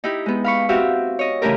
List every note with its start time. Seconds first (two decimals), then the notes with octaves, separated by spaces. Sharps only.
0.04 D#4 E4 G4
0.26 G#3 B3
0.44 F5 B5 C#6
0.69 C4 F#4 G4 E5 F5
1.19 C#5 D#5
1.42 C#3 E3 A3 C#4 G4 A#4